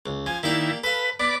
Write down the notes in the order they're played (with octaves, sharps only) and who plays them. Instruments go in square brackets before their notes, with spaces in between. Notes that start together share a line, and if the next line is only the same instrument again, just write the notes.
[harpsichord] C#2
[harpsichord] F3 [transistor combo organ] G#5
[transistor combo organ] D#3 E4 [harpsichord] A#3 G4 D5
[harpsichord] A4 F5 [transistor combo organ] B4
[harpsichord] B3 [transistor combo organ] D5 B5 D6